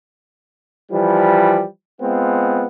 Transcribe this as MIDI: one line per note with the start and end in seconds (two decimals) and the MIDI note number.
0.92 1.63 52
0.92 1.63 53
0.92 1.63 55
2.00 2.66 56
2.00 2.66 59
2.00 2.66 60
2.00 2.66 65